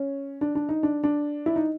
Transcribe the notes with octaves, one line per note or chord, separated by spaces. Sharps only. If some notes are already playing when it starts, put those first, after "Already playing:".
Already playing: C#4
D4
D4
D#4
D4
D4
E4
D#4